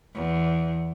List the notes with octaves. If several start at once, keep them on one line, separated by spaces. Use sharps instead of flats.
E2